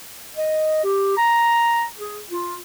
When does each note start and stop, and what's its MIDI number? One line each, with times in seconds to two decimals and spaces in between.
0.35 0.80 75
0.84 1.15 67
1.17 1.83 82
1.97 2.18 68
2.30 2.55 65